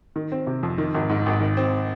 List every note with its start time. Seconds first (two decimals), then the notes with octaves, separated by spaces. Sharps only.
0.16 D#3
0.32 C4
0.47 C3
0.63 F2
0.78 D#3
0.94 G#1
1.09 G#2
1.26 G#1
1.41 D#3
1.57 C4